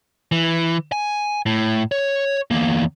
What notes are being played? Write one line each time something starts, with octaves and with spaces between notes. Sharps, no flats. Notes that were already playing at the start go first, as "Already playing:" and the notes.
E3
G#5
A2
C#5
E2 A#3